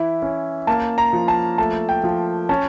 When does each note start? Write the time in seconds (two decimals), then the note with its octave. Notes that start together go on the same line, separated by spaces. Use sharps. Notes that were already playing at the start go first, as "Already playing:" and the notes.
Already playing: E3 E4
0.22 C#4
0.67 A#3 A5
0.98 A#5
1.13 F3
1.28 A5
1.58 A3 A5
1.89 G5
2.04 F3
2.49 C#4 A5